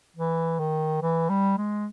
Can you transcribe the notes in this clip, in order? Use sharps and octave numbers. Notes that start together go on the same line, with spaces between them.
E3
D#3
E3
G3
G#3